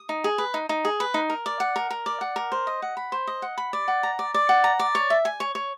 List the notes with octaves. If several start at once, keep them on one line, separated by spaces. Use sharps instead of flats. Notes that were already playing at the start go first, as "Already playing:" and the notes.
Already playing: D#6
D#4
G#4
B4
D#4
D#4
G#4
B4
D#4
A#4
D5
F#5
A#4
A#4
D5
F#5
A#4
C5
D#5
F#5
B5
C5
D#5
F#5
B5
D5
F#5
A#5
D5
D5
F#5
A#5
D5
C#5
E5
G#5
C#5
C#5